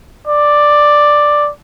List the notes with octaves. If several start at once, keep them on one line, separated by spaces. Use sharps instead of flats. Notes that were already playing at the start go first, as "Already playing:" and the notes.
D5